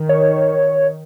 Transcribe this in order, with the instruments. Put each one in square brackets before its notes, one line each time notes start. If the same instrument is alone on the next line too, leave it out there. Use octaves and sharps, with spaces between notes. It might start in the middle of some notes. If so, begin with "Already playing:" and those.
Already playing: [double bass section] D#3
[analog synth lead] C#5